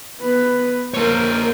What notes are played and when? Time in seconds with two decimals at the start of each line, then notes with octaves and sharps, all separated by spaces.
0.20 B3 B4
0.94 A#3 A#4 C5 C#5